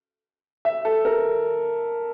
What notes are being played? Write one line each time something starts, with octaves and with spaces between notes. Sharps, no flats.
E5
A4
A#4